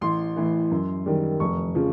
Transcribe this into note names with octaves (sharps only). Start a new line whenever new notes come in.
A1 C6
A2 E3
F#2
D#3 G3
F1 C#6
C#3 F3